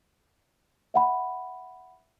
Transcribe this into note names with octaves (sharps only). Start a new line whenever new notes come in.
E5 F#5 B5